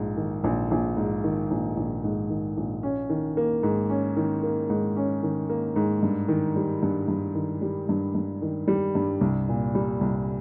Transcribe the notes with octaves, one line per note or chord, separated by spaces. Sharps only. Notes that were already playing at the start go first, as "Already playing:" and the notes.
Already playing: A#1 G#2
D#3
A#1
A#1
G#2
D#3
A#1
A#1
G#2
D#3
A#1
C#4
D#3
A#3
G#2
C#4
D#3
A#3
G#2
C#4
D#3
A#3
G#2
G2
D#3
G3
G2
G2
D#3
G3
G2
G2
D#3
G3
G2
C2
A#2
G3
C2